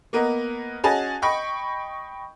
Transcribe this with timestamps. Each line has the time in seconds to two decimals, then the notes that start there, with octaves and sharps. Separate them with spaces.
0.13 A#3 B3 A#4 D#5
0.84 C#4 F#4 G#4 D#5 G#5 A5
1.22 D#5 G5 B5 C#6